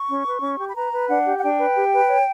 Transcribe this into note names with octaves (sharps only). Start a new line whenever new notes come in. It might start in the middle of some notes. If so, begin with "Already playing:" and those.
Already playing: C#6
C#4
B4
C#4
G4
B5
B4 A#5
B4
D4 F#5
G4
F#5
D4 G5
B4
G4
B4
C#5